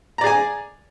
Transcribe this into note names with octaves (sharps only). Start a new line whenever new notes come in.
G#4 D5 G#5 A#5